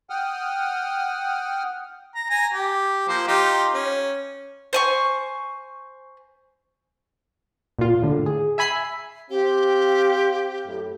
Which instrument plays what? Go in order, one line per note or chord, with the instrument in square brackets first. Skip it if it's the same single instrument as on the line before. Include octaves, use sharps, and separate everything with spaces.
[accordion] F#5 G5 D#6 F6
[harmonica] A#5
G#5 A#5
G4
F3 A#3 C5
D#4 F4 G4
C#4
[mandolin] C5 G#5 C#6
[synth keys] A#2 F4
A2 D3
G#4
E5 G#5 B5 B6 C7
[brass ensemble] C4 F5 [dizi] G4
[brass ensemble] F#2 A2